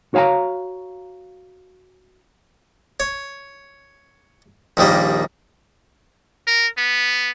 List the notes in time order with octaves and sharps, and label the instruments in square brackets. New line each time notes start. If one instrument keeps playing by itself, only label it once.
[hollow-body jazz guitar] F#4 C#5 F5 G#5 A#5
[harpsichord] C#5
A#1 D#2 D#3 G3 A#3
[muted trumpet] A#4
B3